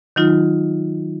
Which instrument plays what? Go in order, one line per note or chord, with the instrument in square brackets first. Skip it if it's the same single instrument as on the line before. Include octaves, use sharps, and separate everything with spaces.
[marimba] D#3 F#3 D#4 F4